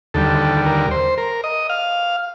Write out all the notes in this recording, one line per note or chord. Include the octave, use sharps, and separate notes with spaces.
D#2 D3 G3 A4
A#4
C5
A#4
D#5
F5